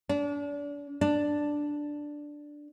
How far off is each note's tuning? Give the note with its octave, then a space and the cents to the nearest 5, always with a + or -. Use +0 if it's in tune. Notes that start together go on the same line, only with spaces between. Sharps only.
D4 -35
D4 +0